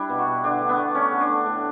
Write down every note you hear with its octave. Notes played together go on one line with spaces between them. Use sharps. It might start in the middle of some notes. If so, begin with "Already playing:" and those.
Already playing: G3 D4 E4
B2
F#4
B2
D3 D4
A3
B3
A3
A3 C#4
D3
D4
A3
A2